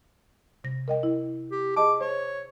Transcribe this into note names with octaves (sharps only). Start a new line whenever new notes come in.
C3 A#6
A#4 D#5 G5
E4
G4
G#4 D#5 A5 D6
C5 C#5